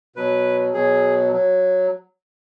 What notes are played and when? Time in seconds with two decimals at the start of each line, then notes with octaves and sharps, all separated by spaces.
0.16 B2 F#3 B4
0.74 B2 F#3 G#4
1.32 F#3